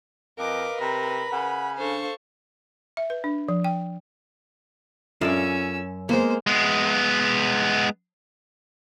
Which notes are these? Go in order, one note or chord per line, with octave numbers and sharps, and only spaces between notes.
F2 A#4 B4 D#5 F5 D6
C3 A#5 B5
C#3 F#5
D4 A4 C5 F5 C#6
E5
B4
D4
F3
G5
F#2 C#4 F4 A4 D5 E6
G#3 A#3 B3 C5
G#3 B3